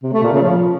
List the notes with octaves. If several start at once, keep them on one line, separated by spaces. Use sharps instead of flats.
C3
A3
A#2
C#3
F3